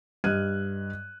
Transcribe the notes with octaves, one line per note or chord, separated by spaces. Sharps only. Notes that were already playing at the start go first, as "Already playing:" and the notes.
G2 D#5 F6 F#6 G#6 D#7